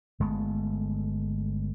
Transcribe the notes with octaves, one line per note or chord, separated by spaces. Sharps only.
G1 G#3 A3 B3